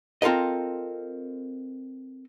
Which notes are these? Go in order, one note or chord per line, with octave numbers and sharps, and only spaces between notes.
C4 F4 A4 A#4 D#5